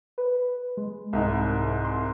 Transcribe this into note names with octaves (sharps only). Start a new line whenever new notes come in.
B4
G#3
C2 G#2
C6